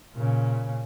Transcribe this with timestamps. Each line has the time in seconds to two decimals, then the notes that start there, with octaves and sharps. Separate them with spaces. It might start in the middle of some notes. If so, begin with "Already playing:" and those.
0.16 A#2 C#3